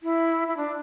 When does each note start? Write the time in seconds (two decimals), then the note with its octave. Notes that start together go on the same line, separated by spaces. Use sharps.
0.03 E4
0.48 E4
0.57 D4